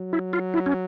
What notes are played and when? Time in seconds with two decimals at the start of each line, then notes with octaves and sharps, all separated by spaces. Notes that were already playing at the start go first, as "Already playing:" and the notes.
Already playing: F#3
0.13 E4
0.33 F4
0.54 E4
0.66 C#4